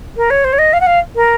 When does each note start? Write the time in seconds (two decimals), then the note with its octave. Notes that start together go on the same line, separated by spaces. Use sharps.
0.17 A#4
0.30 C#5
0.44 C5
0.53 C#5
0.58 D#5
0.73 F5
0.80 F#5
0.86 F5
1.15 A#4